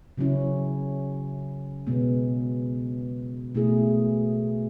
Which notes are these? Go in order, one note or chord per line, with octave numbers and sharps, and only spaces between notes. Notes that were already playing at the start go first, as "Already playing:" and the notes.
C#3 F#3 C#4 E4
B2 G#3 B3
B2 A3 E4 G#4